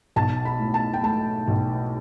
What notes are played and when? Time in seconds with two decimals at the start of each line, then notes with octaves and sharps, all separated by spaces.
0.16 B1 A5
0.45 B5
0.60 A2
0.74 A5
0.93 G5
1.03 A3 A5
1.48 B1